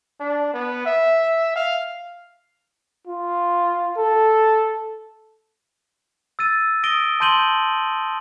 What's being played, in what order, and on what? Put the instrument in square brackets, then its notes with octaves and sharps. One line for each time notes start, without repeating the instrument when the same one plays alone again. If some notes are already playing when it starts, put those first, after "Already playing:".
[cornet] D4
B3
E5
F5
[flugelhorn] F4
A4
[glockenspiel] E6 A6 D#7
D#6 A#6 D7 D#7 G7
A5 C6 G6 D#7 F#7 G7